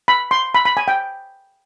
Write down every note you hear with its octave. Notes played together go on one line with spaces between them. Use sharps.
B5
C6
B5
B5
G#5
G5